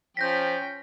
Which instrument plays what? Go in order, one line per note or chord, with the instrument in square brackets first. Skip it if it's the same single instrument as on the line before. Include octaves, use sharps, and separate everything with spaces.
[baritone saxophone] F3 [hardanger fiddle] C#4 G5 [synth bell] G6 A#6 B6